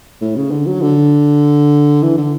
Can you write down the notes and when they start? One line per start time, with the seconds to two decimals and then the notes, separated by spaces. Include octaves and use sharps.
0.21 A2
0.36 C#3
0.51 D3
0.66 F#3
0.82 D3
2.02 E3
2.17 D3